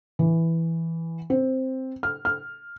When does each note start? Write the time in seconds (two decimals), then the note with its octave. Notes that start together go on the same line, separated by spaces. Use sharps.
0.19 E3
1.30 C4
2.03 F6
2.25 F6